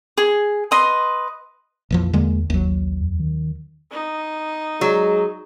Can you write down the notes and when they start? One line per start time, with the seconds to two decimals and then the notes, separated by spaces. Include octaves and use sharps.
0.18 G#4
0.71 B4 D#5 C6
1.91 A#1 F2 E3 F3
2.13 E2 D3 G#3 A#3
2.50 G#1 D#2 F#3
2.66 A#1
3.01 F2
3.20 D#3
3.91 D#4
4.81 F#3 G#3